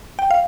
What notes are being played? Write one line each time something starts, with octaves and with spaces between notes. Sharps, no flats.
G5
F5